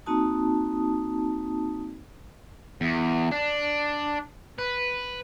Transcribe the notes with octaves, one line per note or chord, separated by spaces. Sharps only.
A#3 C4 D#4 F#4 A5 D#6
E2
D4
B4